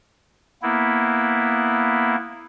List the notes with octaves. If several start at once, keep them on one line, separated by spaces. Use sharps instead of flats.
A#3 B3 E4